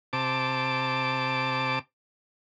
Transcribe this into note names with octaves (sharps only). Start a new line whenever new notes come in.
C3 A5 D6